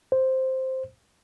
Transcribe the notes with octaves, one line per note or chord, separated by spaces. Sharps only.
C5